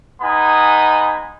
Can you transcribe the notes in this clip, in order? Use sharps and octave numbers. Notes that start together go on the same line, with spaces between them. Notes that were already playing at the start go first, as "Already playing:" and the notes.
G#3 B3 D#4 G#5 B5